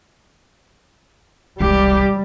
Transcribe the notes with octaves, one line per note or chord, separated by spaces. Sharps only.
E1 C2 G3 G4